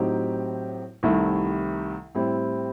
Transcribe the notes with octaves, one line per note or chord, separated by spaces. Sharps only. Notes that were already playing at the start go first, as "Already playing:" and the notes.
Already playing: A2 F#3 C4 D#4 G4
C2 C3 D#3 A3 E4
A2 G3 C4 E4